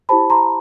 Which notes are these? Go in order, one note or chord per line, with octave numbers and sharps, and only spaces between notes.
E4 G4 C5 A5 B5
A#5 C6